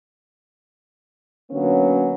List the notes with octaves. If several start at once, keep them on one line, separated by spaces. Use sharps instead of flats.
D3 F#3 A#3 B3 C#4